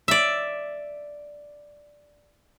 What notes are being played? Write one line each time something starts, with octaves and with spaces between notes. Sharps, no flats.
D5 E5